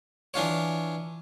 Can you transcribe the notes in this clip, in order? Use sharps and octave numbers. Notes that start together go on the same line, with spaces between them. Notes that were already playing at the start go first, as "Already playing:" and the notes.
E3 D4 F4 C#5